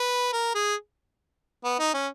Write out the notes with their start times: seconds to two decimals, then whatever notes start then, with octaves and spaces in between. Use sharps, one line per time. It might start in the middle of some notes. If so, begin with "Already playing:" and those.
Already playing: B4
0.33 A#4
0.55 G#4
1.64 B3
1.79 D#4
1.94 C#4